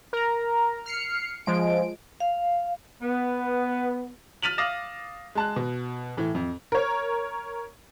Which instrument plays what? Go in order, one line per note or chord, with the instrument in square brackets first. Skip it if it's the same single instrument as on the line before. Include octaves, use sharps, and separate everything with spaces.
[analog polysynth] A#4 A#5
F6 C7 C#7
F3 G#3 D7
[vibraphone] F5
[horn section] B3
[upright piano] F6 A6 B6 D#7 F7 F#7
F5 D6 D#6 A6 A#6 E7
G#3 A5 F#6
B2
A2 E3
F2
[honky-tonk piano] A#4 C#5